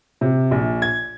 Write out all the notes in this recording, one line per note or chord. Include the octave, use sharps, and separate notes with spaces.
C3
A#1
G#6